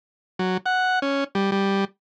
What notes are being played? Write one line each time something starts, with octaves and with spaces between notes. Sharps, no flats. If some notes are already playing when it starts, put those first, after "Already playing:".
F#3
F#5
C#4
G3
G3